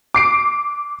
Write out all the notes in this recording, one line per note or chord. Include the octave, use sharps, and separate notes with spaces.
D6 C7 D7